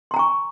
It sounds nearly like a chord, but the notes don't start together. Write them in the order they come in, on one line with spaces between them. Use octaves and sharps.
C6 A#5 G#5 C#6